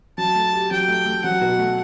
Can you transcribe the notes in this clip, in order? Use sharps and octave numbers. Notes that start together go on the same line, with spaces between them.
F#3 A5
A3
G4
F#3 G5
A3
A3
F#3 F#5
B2
A3